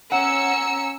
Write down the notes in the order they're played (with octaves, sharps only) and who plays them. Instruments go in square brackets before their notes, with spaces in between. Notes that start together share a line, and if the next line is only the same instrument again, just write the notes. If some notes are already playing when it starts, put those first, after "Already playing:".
[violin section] C#4 E6 C#7 [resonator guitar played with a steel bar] F#5 [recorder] A#5